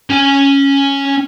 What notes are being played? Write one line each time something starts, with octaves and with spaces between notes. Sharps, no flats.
C#4 G#5